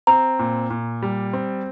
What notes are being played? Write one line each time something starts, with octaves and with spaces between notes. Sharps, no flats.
C4 A#5
A#2
A#2
G3
C4